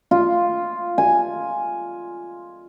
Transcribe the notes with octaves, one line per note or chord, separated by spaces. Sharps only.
F4
G#5